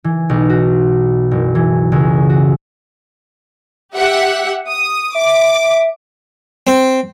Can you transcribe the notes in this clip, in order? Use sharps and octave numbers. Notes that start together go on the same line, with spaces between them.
E3
B1
F#4
F#1
E3
C#2
F#4
G4 E5 F#5
D#6
E5 D6
C4